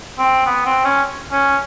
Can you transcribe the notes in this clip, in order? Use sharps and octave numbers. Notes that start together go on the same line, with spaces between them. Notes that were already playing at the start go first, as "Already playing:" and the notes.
C4
B3
C4
C#4
C#4